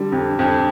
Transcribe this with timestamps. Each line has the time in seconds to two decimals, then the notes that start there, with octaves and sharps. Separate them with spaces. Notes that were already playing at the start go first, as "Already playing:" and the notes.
Already playing: D3 G3
0.12 F2
0.39 F2